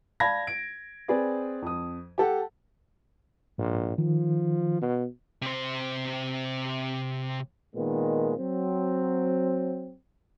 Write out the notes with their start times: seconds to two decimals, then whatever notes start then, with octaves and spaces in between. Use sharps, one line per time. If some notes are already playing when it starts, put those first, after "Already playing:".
0.20 D5 F5 A5 B5 G#6 A#6
0.47 D7
1.08 C4 G#4 B4 D5
1.62 F2 D#6
2.18 G4 A4 F#5
3.58 A#1 G#2
3.98 D#3 F3
4.81 B2
5.42 C3 C5
7.75 A#2 D#3 G#3 B3
8.37 F#3 C4